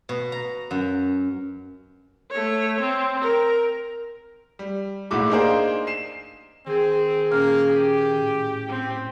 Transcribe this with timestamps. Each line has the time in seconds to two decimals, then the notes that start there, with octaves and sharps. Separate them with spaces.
0.09 B2
0.32 A#5
0.71 F#2
2.31 A3 C#5
2.80 C4
3.21 A#4
4.59 G3
5.11 A#1 G#2 A3 E4 F#4 D6
5.30 A#3 D4 D#4 G#4 A#4 C5
5.87 C7 E7
6.67 D#3 C4 G#4
7.31 A#2 A#3 C#4 F6
7.69 G4
8.20 A2
8.69 C4